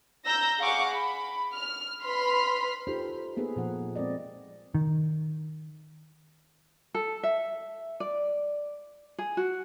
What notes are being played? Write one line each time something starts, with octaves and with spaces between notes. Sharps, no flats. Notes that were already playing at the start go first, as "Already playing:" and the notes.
A#5 E6 G6 A#6
G#4 F5 F#5 C#6 D6
B5
F6
B4 B5 C6 F6 B6
D#4 F4 G4 A4 C5
A#3 B3 D#4 G#4 A4 B4
A#2 F3 F#5
G#3 C4 A4 A#4 D5 D#5
D#3
A4
E5
D5
G#4
F#4